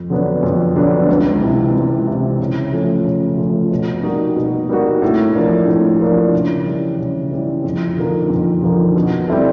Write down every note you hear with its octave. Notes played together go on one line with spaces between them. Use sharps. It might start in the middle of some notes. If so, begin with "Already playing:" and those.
Already playing: F2
D3 F#3 B3 D4
F2
D3 F#3 B3 D4
C#2
C3 E3
C#2
C3 E3
C#3
F3 A3 C#4
C#3
F3 A3 C#4
B2
G3 A#3 D#4 F#4
B2
G3 A#3 D#4 F#4
A2
F3 A#3 D4
A2
F3 A#3 D4
C#3
E3 G3
C#3
E3 G3
F2
D3 F3 A#3 D#4
F2
D3 F3 A#3 D#4
B2
G3 C4 E4 A4